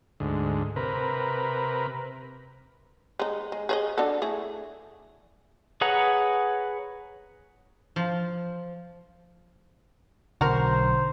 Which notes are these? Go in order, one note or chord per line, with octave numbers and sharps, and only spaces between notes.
D2 G#2
C3 A#4 B4
G#3 D#4
G#3
G#4 C#5 D#5
D4 F#4 A4
A3 E4 G#4
G#4 B4 C#5 F#5 A#5
F3
B1 D3 F#4 A#4 C5